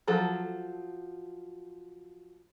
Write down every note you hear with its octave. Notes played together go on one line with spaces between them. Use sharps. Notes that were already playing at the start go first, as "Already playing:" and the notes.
F3 F#3 A4